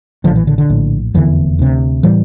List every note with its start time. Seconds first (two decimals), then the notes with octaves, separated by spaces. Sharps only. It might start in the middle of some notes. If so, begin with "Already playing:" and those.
0.24 A#1 A2 D3 F3
0.36 E3
0.47 D3
0.58 D3
0.69 A#1 A2
1.14 F1 E2 D3 E3
1.59 D2 C3
2.03 A2 E3 G3